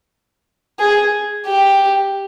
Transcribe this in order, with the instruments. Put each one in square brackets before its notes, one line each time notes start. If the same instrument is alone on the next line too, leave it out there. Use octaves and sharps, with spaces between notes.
[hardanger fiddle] G#4
G4